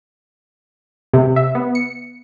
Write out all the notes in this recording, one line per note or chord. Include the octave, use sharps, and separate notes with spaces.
C3
E5
B3
C#7